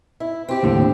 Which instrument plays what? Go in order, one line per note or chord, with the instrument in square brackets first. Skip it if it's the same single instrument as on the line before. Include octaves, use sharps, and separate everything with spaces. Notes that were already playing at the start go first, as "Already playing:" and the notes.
[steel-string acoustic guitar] E4
C4 G4
[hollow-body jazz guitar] D#2 A2 D3